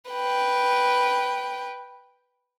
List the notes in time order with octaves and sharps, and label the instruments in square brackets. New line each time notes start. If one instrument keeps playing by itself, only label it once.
[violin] B4 G5